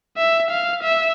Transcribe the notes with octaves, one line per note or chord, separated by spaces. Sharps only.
E5
F5
E5